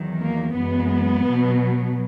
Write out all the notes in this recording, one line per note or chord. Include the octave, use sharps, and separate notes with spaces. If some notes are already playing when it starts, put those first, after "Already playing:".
Already playing: E2 D#3 F#3
A#3
F#2 E3 G#3 B3
B2 F#3